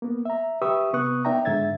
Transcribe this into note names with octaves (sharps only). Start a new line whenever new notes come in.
A#3 B3
E5 A#5
G4 B4 E5 C#6 D#6 E6
C3 B3 B4 C#6 D#6 F#6
B3 D#4 D5 E5 G5 A#5
G#2 D3 E5 G#6 A6